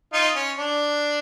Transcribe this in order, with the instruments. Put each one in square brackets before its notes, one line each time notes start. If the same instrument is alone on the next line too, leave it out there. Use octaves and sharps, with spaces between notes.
[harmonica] D#4 F4
C#4
D4